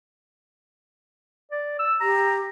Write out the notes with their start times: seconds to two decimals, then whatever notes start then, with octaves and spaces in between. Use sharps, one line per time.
1.51 D5
1.79 E6
2.01 G4 A#5